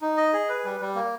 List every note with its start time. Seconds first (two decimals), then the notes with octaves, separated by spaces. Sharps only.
0.02 D#4
0.17 D#5
0.33 G#4
0.49 B4
0.64 G3
0.80 G3
0.95 A#3